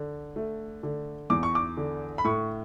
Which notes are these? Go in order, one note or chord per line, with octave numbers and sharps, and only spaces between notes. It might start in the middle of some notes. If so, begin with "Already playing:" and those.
Already playing: D3
A3
D3
E2 D6
C#6
D6
D3
B5
A2 C#6